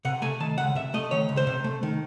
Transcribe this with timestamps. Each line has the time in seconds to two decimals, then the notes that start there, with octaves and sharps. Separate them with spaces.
0.05 C3 F#5
0.22 A3 G#5
0.40 D#3 A5
0.58 C#2 F#5
0.75 C3 E5
0.94 A3 D#5
1.11 D#3 C#5
1.29 C#2
1.37 C5
1.47 C3
1.64 A3
1.83 D#3